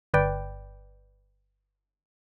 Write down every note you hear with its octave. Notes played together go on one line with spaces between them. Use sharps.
G1 B4 D5 G5